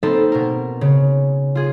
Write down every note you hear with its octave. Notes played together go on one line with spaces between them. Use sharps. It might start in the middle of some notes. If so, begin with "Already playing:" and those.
A#3 C4 D#4 A4 B4
B2 A#4
C#3
F4 G#4